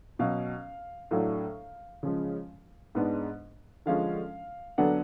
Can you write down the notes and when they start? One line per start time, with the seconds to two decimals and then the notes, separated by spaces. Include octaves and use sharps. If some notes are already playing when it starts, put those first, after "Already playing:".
0.19 B2 F#3 C#4 F5
1.11 A2 F#3 A3 D4 F5
2.03 C#3 F3 G#3
2.95 G#2 G#3 B3 D4
3.86 D3 F3 G#3 C#4 F5
4.78 D3 F#3 B3 D4 F#5